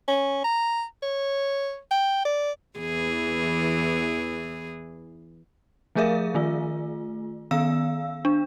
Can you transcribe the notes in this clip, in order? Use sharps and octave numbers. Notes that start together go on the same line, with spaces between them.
C#4
A#5
C#5
G5
D5
E2 E3 G#4
F3 A3 G#4 A#4 E5 F5
D#3 A3 F4
D#3 B3 F5 E6
D4